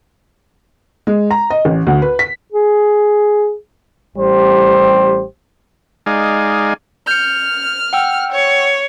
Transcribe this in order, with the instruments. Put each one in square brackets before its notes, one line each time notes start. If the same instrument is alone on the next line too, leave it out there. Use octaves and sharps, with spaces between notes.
[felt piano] G#3
A#5
D#5
A1
D2
B4
B6
[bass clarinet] G#4
[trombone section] A1 G3 G4 C5
[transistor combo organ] G#3 D#4 D5 F5 G#5
[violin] F6 [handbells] G6 C#7
[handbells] F#5 G5 E6
[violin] C#5